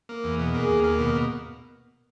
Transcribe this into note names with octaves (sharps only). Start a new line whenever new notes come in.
A#3
E2
B2
A#3 G#4
D#2
A#3
B2
B2